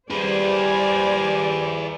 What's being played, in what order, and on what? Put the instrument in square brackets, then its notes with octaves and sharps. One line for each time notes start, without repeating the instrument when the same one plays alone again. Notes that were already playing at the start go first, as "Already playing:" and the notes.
[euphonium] G3 [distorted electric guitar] G#4 B4 [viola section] C5 G#5 [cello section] D5